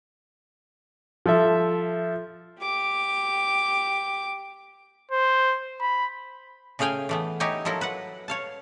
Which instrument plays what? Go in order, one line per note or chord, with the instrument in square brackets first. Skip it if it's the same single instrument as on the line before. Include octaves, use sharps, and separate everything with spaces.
[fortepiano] F3 A4 E5
[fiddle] G4 D6
[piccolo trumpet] C5
B5
[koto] C#3 A3 G#4 F5 G5 G#5
E3 A3 B3
D#4 E4 G4 C#5 G5 G#5
F3 F#3 E4 A4 A#4
B4 F#5
C#5 F5 A5